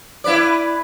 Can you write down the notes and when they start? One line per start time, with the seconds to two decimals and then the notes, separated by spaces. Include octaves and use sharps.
0.24 E4 B4 D5